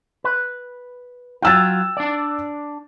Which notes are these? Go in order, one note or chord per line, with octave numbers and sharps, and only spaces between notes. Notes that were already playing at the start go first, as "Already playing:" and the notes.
B4
F#3 F4 G5 E6 A6
D4 D5